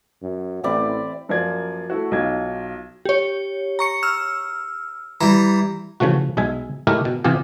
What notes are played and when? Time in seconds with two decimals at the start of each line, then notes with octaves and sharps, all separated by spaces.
0.22 F#2
0.64 A1 C4 E4 D5
1.29 F#2 F3 A#3 D5 G#6
1.90 A3 E4 F#4
2.11 B1 D#4 F4 G#6
3.05 G4 C#5
3.79 A#5 C#6 C#7
4.03 E6 F6
5.21 E3 G3 A#5
6.00 C#3 E3 F3 A3 F#4
6.37 B1 G#3 E5 G#5
6.87 G#3 A3 E4 G4 A#4
7.05 B2
7.24 C3 E3 C4 F4 G4 G#4